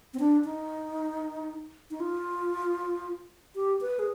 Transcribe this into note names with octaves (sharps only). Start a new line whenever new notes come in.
C4
D4
D#4
D#4
F4
G4
B4
G#4